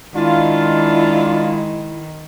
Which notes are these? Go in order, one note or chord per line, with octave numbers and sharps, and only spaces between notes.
D#3 G#3 D4 E4 F4